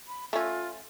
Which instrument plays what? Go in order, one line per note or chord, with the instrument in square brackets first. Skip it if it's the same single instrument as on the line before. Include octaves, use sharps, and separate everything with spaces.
[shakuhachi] B5
[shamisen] A3 C#4 [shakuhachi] F4